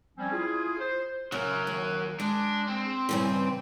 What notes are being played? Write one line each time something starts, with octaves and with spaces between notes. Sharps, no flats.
F3 G3 C4 C#4
E4 F4 G#4
C5
C#3 F#3 A#4
D#2
G#3 D4
C4
G2 C#3 E3